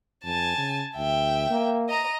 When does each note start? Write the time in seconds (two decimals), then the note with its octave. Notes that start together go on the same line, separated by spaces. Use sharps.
0.24 F2 G#5 A5
0.57 C#3
0.96 D2 E5 G5
1.50 A#3
1.89 D#5 A#5